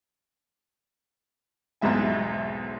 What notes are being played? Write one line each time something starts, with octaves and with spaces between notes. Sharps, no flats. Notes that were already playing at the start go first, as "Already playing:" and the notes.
B1 E2 G#2 G#3 E5 G#5